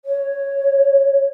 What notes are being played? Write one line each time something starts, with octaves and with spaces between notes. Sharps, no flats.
C#5